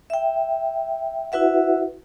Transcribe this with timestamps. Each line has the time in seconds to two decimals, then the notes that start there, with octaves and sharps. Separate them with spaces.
0.10 E5 G5
1.32 E4 F#4 B4 E5 F#5